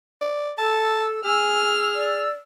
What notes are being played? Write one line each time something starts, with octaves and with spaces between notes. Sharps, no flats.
D5
A4 A5 E6
G#4 G#5 E6 F6
D5